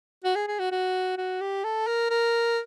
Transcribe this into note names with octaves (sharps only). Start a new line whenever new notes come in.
F#4
G#4
G#4
F#4
F#4
F#4
G4
A4
A#4
A#4